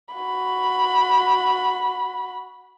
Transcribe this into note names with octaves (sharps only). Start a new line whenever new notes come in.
F#4 B5